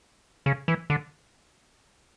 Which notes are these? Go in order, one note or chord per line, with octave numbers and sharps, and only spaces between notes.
C#3
E3
D3